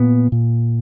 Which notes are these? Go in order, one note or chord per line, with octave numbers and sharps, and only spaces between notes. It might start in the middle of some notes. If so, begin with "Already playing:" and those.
Already playing: A#2 B3
A#2